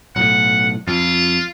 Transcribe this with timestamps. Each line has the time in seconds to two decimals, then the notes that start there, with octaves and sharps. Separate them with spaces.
0.16 B1 A2 F#5
0.87 F2 F4